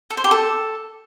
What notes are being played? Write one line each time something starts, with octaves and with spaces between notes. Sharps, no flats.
A4
C5
G4
A4